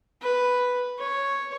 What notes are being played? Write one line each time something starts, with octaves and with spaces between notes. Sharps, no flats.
B4
C#5